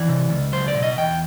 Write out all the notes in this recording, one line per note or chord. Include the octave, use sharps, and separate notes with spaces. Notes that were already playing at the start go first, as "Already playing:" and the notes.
Already playing: E3 D5
C3
C#2
F#3 C5
D5
B2
D#5
E2 G5